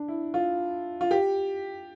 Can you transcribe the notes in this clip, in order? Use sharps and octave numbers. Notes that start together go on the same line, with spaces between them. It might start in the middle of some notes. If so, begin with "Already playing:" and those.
Already playing: D4
E4
F4
F4
G4